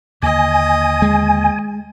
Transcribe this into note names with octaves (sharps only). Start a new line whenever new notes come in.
D#2 D3 A#3 D#5 G#5
G#3